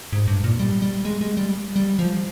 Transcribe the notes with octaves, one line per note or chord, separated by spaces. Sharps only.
G#2
G2
A#2
G3
G3
G#3
G#3
G3
G3
F3